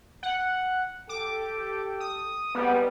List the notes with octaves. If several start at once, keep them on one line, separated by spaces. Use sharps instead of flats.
F#5
G4 A4 D6
D#6
G#2 G3 B3